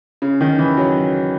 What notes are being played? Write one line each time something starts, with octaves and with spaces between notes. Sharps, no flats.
C#3
D#3
E3
F#3